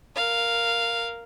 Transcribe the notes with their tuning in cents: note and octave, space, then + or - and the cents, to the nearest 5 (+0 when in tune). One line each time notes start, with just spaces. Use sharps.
A#4 +0 F5 +0